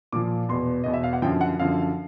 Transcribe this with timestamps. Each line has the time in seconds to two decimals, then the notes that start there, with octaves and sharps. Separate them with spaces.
0.12 A#2 F3 D6
0.49 E2 B2 C6
0.84 E2 B2 D#5
0.94 E5
1.03 F5
1.13 F#5
1.22 F#2 D3 F3 G5
1.41 F#5
1.59 F#2 D3 F3 F5